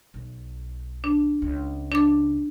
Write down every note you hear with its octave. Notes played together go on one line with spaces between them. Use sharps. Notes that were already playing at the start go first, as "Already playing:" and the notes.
B1
D4
C#2
D4 D6